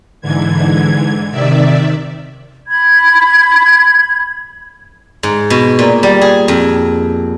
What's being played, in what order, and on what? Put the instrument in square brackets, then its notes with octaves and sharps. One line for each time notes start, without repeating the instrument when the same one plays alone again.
[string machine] G#2 D3 E3 G#6
C3 D#3 D5 E5
[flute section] B5 G#6
[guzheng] G#2
B2
A#2
G3
G#4
F2